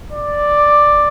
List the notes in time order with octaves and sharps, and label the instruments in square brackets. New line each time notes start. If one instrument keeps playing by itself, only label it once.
[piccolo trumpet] D5